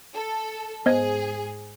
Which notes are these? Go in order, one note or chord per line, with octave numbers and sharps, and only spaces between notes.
A4
G#2 B3 G#4 C5 D#5 G#6